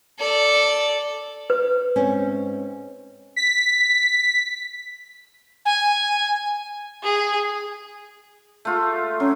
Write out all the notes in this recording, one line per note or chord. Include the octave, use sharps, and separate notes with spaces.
A4 D5
B4
G#2 C4 C#4
B6
G#5
G#4
A3 F4
F#3 C#4